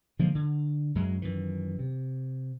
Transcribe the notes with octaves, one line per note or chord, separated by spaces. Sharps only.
D3 F3 G#3 A#3
D3
F#2 F#3 G#3
F#2 D#3 E3
C3